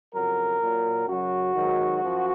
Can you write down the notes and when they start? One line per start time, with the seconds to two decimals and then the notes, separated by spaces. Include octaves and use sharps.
0.13 F2 C#3 F#3 A#4
0.60 A#2 F#3
1.07 F#2 C#3 F#3 F#4
1.55 G#2 D#3 F#3
2.02 F#2 F3